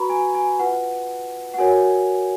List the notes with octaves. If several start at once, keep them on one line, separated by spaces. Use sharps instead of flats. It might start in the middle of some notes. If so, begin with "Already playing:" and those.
Already playing: F#4 B4 A#5 B5 C#6
G#5
G#5
F4 B4 F#5
F#5
F#4 A#4 C#5 G#5